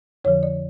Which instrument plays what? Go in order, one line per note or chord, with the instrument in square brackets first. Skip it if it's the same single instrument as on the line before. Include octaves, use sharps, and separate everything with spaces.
[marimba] F2 D3 F3 C#5
D5